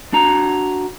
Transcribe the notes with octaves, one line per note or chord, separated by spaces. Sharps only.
D4 F#4 A#5